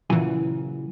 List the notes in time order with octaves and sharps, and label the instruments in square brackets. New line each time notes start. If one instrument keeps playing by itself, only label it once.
[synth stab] A#2 E3 [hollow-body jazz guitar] C#3 F#3 G#5 [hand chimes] E4